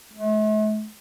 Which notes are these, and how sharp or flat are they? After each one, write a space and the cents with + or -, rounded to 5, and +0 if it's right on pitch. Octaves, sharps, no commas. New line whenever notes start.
A3 -45